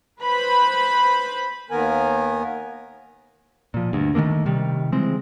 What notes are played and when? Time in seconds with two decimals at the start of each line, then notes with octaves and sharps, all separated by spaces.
0.20 B4 C5 B5
1.71 D#2 D#3 B3 A#4 G#5
3.74 A#2 F3
3.93 D2 G2
4.15 D#3 F3 A3 A#3
4.46 C3 D#3 G3
4.92 C#3 E3 G#3 C4